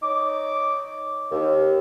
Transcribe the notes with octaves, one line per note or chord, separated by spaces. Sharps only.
D#4 C#5 D6
D#2